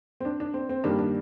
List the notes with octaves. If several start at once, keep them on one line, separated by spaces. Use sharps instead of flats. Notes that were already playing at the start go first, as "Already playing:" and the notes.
C4
D4
D4
C4
C4
G2 D#3 G3 A#3 D4
D4